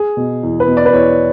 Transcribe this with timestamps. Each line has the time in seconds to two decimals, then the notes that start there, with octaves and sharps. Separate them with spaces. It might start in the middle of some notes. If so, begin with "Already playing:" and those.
Already playing: G#4
0.17 B2
0.43 E2
0.60 B4
0.68 B2
0.77 D5
0.85 B4
0.94 E2 C#5